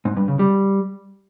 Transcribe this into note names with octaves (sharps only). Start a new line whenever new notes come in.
G#2
G2
C#3
G3